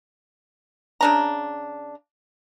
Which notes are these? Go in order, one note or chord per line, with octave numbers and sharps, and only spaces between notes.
C#3 D4 A#5